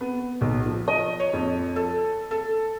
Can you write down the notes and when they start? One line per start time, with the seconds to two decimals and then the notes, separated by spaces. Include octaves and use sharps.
0.01 B3
0.41 B1
0.66 F3
0.88 D#5
1.20 C#5
1.33 F2
1.76 A4
2.31 A4